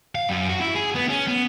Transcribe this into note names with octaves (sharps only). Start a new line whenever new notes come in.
F5
F#2
F#4
E4
G#4
B3
C#4
B3